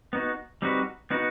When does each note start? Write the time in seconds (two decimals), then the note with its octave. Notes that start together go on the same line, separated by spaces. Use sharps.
0.13 B3 D#4 F#4
0.62 G3 C4 D#4 F#4 B4
1.11 B3 D#4 F#4 B4